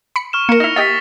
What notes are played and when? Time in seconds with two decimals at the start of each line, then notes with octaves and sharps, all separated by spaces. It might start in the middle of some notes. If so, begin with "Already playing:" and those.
0.16 B5 C#7
0.33 C#6 F6 E7
0.49 A#3 A#4 C#7
0.60 D#4 E4 A#6 F7
0.76 G4 D#5 E5 A6 B6